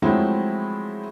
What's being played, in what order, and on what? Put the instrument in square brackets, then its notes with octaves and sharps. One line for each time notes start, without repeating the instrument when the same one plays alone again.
[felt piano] F3 F#3 G#3 A3 C4 E4